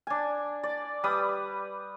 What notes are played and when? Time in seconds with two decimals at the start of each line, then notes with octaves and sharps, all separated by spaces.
0.07 D4 G#5
0.63 D5
1.04 G3 B4 D#6